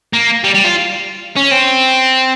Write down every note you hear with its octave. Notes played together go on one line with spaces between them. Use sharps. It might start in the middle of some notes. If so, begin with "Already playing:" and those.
A#3
G3
G3
F4
C#4
C4